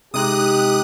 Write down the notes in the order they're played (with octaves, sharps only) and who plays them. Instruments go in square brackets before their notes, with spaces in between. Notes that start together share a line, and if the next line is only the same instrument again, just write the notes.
[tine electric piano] C3 G#3 D#4 [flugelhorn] G4 [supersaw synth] D#6 F#6